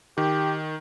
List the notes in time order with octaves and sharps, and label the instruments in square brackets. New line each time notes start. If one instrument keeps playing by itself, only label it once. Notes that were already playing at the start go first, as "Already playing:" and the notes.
[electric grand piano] D#3 [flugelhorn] G4